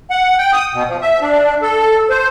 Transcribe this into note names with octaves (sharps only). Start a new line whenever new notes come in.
F#5
G5
D#6
B2
F3
E5
D4
A4
C5